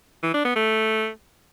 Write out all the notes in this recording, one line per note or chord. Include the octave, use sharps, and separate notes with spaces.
E3
D4
B3
A3